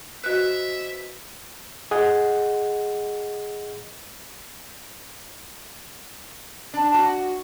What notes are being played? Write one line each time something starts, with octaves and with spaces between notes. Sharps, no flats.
F#4 B4 C5 D#5 E5 F#6
G#4 D#5 F#5
D4
F#4